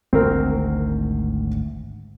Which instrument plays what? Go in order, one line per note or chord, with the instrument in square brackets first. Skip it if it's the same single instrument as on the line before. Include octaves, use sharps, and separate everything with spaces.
[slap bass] G#1 D2 G#2 [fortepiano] C4 A#4